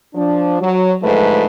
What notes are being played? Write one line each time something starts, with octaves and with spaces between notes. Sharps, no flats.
F3 D4
F#3
G#2 D3 F3 G#3 A3 B4